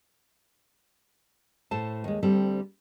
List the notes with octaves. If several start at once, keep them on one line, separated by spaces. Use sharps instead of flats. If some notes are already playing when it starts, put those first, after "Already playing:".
A2 A4 C5 A5
D#2 G#3
D2 G3 C4 A4